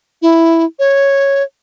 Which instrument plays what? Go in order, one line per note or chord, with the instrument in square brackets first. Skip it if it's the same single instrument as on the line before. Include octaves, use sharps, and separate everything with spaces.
[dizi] E4
C#5